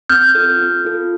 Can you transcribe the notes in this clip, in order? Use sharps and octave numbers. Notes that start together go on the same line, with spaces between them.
C4 F6 G6
F4 A4
C4
F4 A4